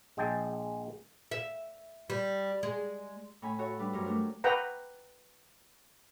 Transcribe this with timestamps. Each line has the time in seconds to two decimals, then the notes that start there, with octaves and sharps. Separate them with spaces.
0.17 A#1 G#3 G#4 G5 A5
1.31 E5
2.10 G3
2.63 G#3
3.42 A2 C#4 G#5 B5
3.59 F#4 A4 C#5 E5
3.79 G3 D4 B4
3.93 G2 F#3 A#4 C5
4.05 A3 D4 A#4
4.44 B4 F#5 G5 A#5